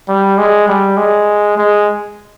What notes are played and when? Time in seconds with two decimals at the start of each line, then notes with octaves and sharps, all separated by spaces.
0.09 G3
0.38 G#3
0.68 G3
0.97 G#3
1.58 G#3